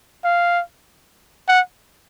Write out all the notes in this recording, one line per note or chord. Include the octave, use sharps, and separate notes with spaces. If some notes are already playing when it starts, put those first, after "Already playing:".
F5
F#5